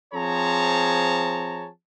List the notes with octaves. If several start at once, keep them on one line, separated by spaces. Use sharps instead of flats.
F3 C4 G#4 C#5 A5 A#5